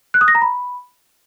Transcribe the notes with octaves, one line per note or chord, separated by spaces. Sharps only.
F#6
D#6
A#6
A#5
B5